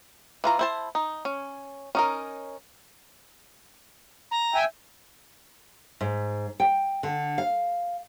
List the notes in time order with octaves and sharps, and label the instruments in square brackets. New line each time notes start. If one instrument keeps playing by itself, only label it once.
[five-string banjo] E3 F4 A#5
E4 C5 A5
D#4
C#4
C#4 D#4 A#4
[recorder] A#5
[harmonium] E5 G5 G#5
[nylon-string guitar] G#2
G5
D3
F5